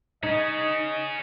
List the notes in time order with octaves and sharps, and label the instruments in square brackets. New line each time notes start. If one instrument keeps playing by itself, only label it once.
[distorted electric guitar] C#4 G#4 [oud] D#4 [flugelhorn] D#5